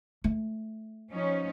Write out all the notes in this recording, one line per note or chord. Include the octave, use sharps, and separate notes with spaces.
A3
F3 C#4 D#4